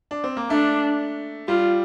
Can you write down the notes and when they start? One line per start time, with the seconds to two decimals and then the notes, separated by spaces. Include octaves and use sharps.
0.11 D4
0.24 C4
0.37 A#3
0.50 A3 D4
1.48 G3 F4